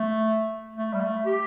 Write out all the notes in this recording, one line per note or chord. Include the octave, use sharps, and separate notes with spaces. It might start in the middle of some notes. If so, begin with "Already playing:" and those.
Already playing: A3
A3
G3
A3
G4